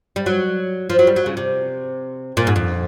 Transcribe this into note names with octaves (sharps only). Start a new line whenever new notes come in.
G3
F#3
F3
F#3
G3
F#3
C#3
C3
A#2
G#2
F2